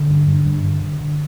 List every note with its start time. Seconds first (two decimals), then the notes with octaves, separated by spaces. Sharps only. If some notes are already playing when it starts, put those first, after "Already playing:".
Already playing: D3
0.09 G2
0.27 G2
0.45 G2
0.64 D3
0.82 D3
1.00 D3